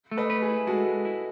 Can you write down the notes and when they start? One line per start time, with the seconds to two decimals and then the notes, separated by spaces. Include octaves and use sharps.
0.11 A3
0.17 B4 D#5
0.30 B4
0.42 G#4
0.49 E4
0.67 G#3 F#4 A4
0.86 G#3
1.05 E4